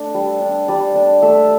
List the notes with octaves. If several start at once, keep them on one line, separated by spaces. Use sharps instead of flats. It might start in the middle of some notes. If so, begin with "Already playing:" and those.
Already playing: A3 D4 D5
G3
D4
G3 D5
D4
A3 E5